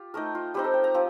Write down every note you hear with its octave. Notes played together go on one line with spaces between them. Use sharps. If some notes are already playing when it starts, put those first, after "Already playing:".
Already playing: F4 G4
A3 D#4 A#4
F4
G3 C4 D#4 G4
A4
G5
A#5
F3 C4